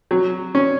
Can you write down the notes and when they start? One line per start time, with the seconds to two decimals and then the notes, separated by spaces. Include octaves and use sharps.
0.11 F#3
0.55 C#4